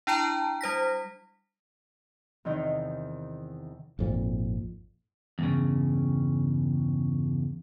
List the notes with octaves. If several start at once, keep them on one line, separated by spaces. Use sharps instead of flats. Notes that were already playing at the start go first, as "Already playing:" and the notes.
D4 E4 G5 A5 A#5
G3 C5 A#6 B6
E2 C3 D#3 D#4
G#1 F2 A#2
E2 G2 C#3